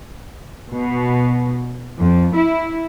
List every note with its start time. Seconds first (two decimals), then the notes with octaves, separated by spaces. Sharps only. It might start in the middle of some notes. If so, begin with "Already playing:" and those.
0.71 B2
1.99 F2
2.34 E4